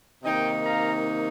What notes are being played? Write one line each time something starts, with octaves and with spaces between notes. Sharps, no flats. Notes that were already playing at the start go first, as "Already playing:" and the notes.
C3 D#3 A#3 D#4 D#5 G5
F5 A#5